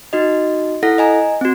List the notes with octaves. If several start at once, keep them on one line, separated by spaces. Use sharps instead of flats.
D#4 F#4 D#5
E4 A4 F#5 A#6
D#5 G#5 A#5
C4 F#4